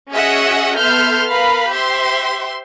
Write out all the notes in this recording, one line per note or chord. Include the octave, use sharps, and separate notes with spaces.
C#4 F#4 G#4 D#5 E5 F#5
B3 A4 E5 C6 F6 G6
A#4 B4 F5 B5
G4 C5 E5 C6